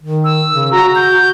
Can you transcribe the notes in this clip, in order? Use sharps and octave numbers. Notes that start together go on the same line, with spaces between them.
D#3
E6
C#3
F#4 A#5
G6